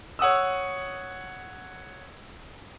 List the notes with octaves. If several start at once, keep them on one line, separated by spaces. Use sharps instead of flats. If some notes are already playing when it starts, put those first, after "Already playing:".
C#5 F#5 D#6 E6